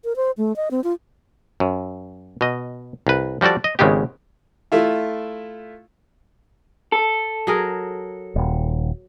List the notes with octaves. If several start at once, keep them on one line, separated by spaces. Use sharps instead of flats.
A#4
C5
A3
D#5
C4
F4
F#2
B2 D#5
C2 B4
F3 G3 F#4 A4 D5
D#5
G#1 C#3 G#3 B3 G4
A3 E4 F4
A4
F#3 G#4 A#4
D#1